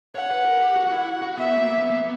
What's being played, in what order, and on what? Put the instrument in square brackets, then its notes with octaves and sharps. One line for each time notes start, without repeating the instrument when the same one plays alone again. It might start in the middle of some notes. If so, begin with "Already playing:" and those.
[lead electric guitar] C#5 [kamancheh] F#5
[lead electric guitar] B4
A#4
G4
F#4
F#4
E4
F#4
[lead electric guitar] B3 [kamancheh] E5
[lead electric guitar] A#3
B3
A#3
B3